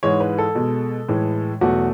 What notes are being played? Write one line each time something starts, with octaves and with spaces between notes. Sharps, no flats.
G#2 E3 G#3 C#5
B4
A4
B2 G#3
A2 E3 G#3
E2 B2 F#3 A3 F#4